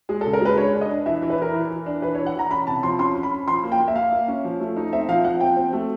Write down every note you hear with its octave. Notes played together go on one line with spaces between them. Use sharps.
G#3 G#4
A4
C#3
A#4
G#3 B4
D4 C#5
D4
D#5
D4
E3 E5
E3
B4
E3 A#4
E3
E3
D4
E3 B4
C#5
E3
F#5
E3 A#5
C#4 B5
C3 A5
F3 C6
C#4 C6
C#4
B5
C#4
F3 C6
A#3
G5
A#3
E5
A#3 F5
A#3
C#4
F3
A3
D#4
C4 E5
F3 F5
F3 F#5
C4 G5
C4
A3